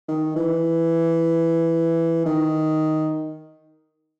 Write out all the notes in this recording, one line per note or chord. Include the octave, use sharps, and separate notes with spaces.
D#3
E3
D#3